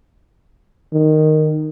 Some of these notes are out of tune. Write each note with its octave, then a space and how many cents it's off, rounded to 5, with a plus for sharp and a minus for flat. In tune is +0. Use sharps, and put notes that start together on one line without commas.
D#3 -10